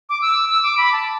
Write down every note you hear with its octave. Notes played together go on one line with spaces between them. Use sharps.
D6
E6
E6
D6
B5
A5